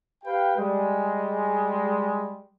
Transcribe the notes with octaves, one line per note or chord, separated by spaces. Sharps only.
G4 B4 F5 G5
G3 G#3